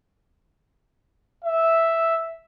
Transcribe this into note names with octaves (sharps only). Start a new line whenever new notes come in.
E5